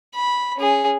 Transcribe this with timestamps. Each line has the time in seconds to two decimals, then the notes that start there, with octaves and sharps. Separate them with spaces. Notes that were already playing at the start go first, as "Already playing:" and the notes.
0.15 B5
0.57 C#4 G#4